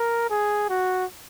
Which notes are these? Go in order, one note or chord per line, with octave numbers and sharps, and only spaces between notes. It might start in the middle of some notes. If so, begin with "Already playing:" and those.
Already playing: A#4
G#4
F#4